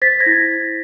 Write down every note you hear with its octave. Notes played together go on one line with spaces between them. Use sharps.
C5 A6 B6
G#6 A#6
E4